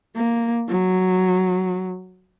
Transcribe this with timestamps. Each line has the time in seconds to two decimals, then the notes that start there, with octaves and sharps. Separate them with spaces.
0.16 A#3
0.68 F#3